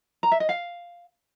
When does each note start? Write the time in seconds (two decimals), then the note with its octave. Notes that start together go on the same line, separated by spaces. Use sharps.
0.23 A#5
0.32 E5
0.40 D#5
0.49 F5